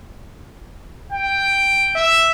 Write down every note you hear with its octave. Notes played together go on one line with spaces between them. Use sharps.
G5
E5